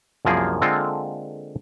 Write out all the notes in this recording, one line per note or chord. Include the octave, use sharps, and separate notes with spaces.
C2 F#2 F3 A#3 G#4
D3 G#3 A#3 C4 F4 A4